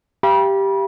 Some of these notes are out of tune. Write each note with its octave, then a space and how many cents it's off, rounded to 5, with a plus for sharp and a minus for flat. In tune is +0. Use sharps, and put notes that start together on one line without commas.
G4 +0 F5 -35 B5 -35